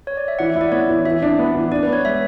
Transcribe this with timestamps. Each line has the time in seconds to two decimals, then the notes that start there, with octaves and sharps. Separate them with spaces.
0.07 C#5
0.17 D5
0.28 E5
0.39 E3 F#5
0.50 E5
0.56 E4
0.61 D5
0.72 B3 C#5
0.89 E3
1.05 E3 E5
1.22 D4
1.39 B3
1.55 E3
1.71 D4 D5
1.83 B4
1.87 B3
1.93 C#5
2.05 G#3 E5